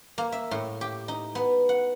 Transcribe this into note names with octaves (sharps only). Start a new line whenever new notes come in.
A#3
E5
A2
G4
D#4
B3
F#5